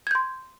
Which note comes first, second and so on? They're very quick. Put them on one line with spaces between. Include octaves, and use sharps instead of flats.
G#6 G6 C6